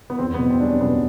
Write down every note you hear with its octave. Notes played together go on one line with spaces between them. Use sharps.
B3
E2 C4
B3
B2
C4
G3 D4
C#4
B2 B3